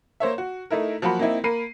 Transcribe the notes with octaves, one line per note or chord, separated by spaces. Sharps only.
A#3 C5 C#5 E5
F#4
A3 D#4 E4 A#4
F3 F#3 A#3 F#4 B5
A#3 C4 D#4 E4
A#3 A#4 B5 C7 D#7